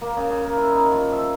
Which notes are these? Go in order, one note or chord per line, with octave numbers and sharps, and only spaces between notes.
A#3
C#3
C#3
A#4
E4
D#4
F3
E5